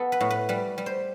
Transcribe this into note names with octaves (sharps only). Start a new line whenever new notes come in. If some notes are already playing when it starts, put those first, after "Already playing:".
Already playing: B3 A4
B4
A2
B4
G3 B4
G3
C5